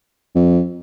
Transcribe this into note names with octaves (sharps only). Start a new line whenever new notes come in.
F2